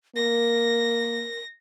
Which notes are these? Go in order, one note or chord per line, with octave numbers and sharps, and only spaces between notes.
A#3 A#4 A#6